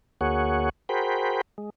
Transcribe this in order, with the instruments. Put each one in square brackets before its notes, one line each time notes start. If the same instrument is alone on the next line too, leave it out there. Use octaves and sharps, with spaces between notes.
[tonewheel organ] D2 A#3 F#4 G#4 C#5 F#5
F#4 G#4 A#4 C5 G5 B5
G#3